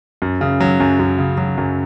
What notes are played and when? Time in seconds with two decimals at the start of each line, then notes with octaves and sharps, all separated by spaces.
0.22 F#2
0.41 C#3
0.60 F#3
0.80 F#2
0.99 F#2
1.19 C#3
1.38 F#3
1.58 F#2